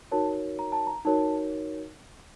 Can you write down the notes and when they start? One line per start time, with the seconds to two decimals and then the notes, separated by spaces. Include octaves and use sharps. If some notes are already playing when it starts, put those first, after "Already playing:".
0.11 D#4 F#4 A#4 C#5 A5
0.59 A#5
0.72 A5
0.87 A#5
1.05 D#4 F#4 A#4 C#5 A5